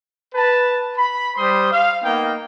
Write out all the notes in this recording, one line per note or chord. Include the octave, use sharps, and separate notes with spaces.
B4 A5
B5
G3 C5 C6 D#6
F5
A#3 B3 D#4 G5